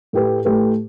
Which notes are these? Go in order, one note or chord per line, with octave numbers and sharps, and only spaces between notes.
A2 A3 G4 B4
A2 A3 G4 B4